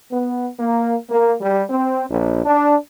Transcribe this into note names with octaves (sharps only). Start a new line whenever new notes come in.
B3
A#3
A#3
G3
C4
A#1
D4